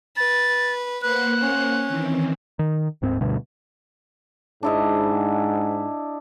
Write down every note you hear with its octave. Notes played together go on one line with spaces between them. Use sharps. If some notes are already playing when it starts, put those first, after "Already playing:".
B4 A6
A#3 B4 C5 F#5 F#6
C#4
D#3 E3 C4
D#3
D1 G#2 C4
D2 G2 B2
G#2 D4 E4 D#5